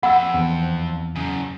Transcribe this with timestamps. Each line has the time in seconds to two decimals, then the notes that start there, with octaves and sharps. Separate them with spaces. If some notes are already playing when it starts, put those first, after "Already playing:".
0.03 F2 F#5 B5 E6
0.34 E2
1.16 F#2 C#3